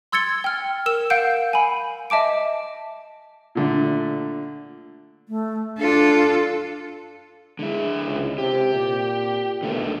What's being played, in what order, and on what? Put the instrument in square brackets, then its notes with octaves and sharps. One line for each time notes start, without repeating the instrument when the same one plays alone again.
[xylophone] C6 E6 G#6 A6 C#7 G7
G5 F6
A#4 E6 E7
F5 F#5 G6 D7
G#5 B5
D#5 E5 A5 D6 D7
[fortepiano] A#2 D3 A3
[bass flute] A3
[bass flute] D4 [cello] F4 A4
[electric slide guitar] D3 E4 [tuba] G#3
[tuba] C#2
[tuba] C3 [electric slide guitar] G4
[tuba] A#2
[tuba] B1 [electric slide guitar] D3 A3 A#3